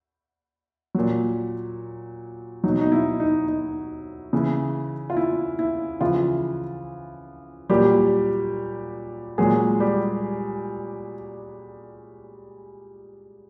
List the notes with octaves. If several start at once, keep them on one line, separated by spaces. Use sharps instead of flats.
A#2 F#3
B2 F#3 D#4
D#4
E4
D#4
D#4
C#3 E3
F4
E4
E4
C#3 E3 F3 F4
A#2 F#3 G3 G4
A#2 F#3 G#3 G#4
G3 G4